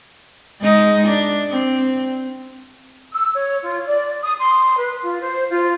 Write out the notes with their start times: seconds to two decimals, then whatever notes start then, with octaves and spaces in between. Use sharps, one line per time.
0.60 G#3 D#4
1.07 D4
1.50 C4
3.11 E6
3.34 C#5
3.62 F4
3.86 D5
4.22 D#6
4.37 C6
4.77 B4
5.03 F4
5.21 C5
5.49 F4